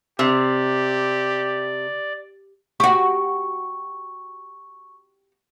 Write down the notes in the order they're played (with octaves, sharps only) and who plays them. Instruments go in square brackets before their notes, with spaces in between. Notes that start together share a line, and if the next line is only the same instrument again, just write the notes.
[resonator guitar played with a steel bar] C3 [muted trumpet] G4 [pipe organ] D5
[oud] F#4 G4 [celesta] C#6